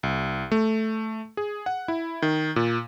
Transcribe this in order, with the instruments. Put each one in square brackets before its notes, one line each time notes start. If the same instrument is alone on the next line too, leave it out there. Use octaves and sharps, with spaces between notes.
[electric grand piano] C2
A3
G#4
F#5
E4
D#3
A#2